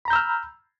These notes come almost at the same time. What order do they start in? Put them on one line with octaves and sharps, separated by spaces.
B5 A#5 G6 E6 F6